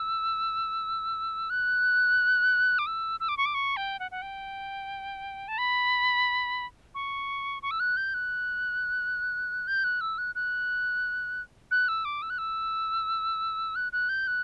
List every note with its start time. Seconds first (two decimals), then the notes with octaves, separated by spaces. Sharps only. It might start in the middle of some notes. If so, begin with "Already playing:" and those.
Already playing: E6
1.50 F#6
2.79 D6
2.86 E6
3.20 E6
3.29 D6
3.37 C#6
3.46 D6
3.54 C#6
3.77 G5
4.00 F#5
4.11 F#5
4.22 G5
5.48 A5
5.58 B5
6.95 C#6
7.63 C#6
7.71 E6
7.80 F#6
7.97 G6
8.14 F#6
9.67 G6
9.84 F#6
10.01 E6
10.18 F#6
10.35 F#6
11.71 F#6
11.88 E6
12.05 D6
12.22 E6
12.30 F#6
12.38 E6
13.76 F#6
13.93 F#6
14.09 G6
14.27 F#6